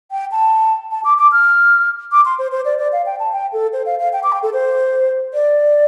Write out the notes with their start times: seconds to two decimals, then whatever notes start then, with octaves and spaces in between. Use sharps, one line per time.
0.11 G5
0.32 A5
0.92 A5
1.04 D6
1.18 D6
1.32 F6
2.12 D6
2.25 C6
2.39 C5
2.52 C5
2.65 D5
2.79 D5
2.92 F5
3.06 G5
3.20 A5
3.33 G5
3.53 A4
3.73 C5
3.86 F5
3.99 F5
4.13 G5
4.23 D6
4.32 G5
4.43 A4
4.53 C5
5.34 D5